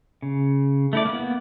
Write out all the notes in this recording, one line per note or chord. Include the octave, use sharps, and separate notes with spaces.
C#3
A3 E4 D5
A#3 B3